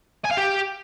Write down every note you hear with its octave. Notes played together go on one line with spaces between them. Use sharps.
G#5
F5
G4